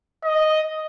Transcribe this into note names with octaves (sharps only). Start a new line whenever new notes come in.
D#5